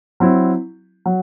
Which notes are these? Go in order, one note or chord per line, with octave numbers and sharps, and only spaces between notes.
F#3 C4 E4
F#3